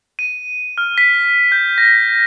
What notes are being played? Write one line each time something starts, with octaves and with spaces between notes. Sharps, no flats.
D#7
F6
B6
G6
A#6